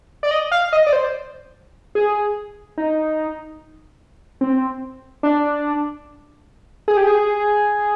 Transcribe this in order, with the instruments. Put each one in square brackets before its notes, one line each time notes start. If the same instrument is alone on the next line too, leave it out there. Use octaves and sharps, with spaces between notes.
[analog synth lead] D5
D#5
F5
D#5
D5
C5
G#4
D#4
C4
D4
G#4
G4
G#4